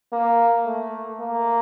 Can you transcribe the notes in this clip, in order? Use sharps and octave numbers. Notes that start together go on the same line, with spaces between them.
A#3
A3
A#3